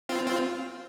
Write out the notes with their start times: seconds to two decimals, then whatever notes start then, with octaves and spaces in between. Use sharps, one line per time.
0.09 C4 F4
0.26 C4 F4